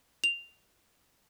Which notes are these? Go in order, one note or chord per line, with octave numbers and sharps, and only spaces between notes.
F7